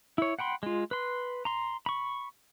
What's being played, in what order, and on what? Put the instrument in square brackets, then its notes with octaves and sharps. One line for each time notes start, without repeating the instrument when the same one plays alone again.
[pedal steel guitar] E4 C#5
F#5 G5 B5 C6
G#3 F4
B4 C6
A#5 C6
B5 C#6